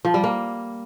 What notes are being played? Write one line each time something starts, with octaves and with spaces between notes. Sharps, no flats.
F3
G3
A#3